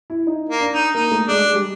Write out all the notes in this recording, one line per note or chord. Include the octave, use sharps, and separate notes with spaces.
E4
D#4
A#3
D4
D#4
A#3 D#4
A3
G#3 D4
G#3
G3